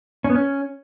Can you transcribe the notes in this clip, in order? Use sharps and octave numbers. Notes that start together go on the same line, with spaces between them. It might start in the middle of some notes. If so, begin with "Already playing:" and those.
C#4
B3
C#4